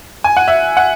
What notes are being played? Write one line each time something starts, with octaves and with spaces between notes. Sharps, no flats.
G#5
F#5
E5
F#5